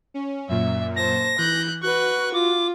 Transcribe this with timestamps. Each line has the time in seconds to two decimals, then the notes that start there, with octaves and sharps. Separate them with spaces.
0.14 C#4
0.49 F#2 A#2 E5
0.96 C5 A5 A#6
1.38 E3 F#6 G6
1.83 F#4 B4 C#6 F#6
2.34 F4 D6